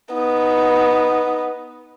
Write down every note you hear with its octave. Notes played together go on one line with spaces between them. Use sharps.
B3 D#4